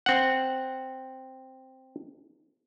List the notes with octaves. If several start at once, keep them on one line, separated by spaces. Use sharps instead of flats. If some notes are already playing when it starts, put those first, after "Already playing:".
C4 F#5